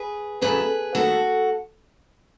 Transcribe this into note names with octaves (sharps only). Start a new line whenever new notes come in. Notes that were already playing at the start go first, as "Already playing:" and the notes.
Already playing: G#4 B4
E2 C#3 F#3 A3 G#4 B4
D#2 D#3 A3 F#4 A4